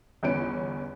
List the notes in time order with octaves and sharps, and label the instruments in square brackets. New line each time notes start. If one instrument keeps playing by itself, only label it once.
[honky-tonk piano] G1 E2 B3 C#4 D7